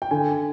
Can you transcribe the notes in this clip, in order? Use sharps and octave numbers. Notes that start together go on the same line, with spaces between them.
G5
D3 G#5